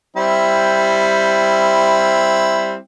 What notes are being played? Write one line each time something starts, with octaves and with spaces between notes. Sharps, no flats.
G3 C4 E4